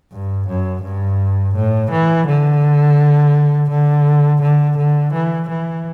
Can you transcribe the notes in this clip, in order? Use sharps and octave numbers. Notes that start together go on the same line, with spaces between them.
G2
F#2
G2
A2
E3
D3
D3
D3
D3
E3
E3